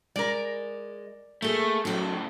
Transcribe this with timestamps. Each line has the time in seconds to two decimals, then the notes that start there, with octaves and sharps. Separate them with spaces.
0.16 G#3 A#4 D5
1.42 A3 A#3 G#4
1.85 A2 C#3 F#3 A4